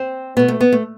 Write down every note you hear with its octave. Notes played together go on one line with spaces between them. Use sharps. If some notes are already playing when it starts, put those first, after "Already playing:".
Already playing: C4
B2 A3 B3
A3
B3
A3